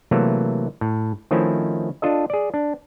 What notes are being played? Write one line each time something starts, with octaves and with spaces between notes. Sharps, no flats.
C3 E3 F#3 A3 A#3
A2
D#3 F3 A3 C4 C#4 E4
D4 F4 A4 D#5
G#4 D5
D4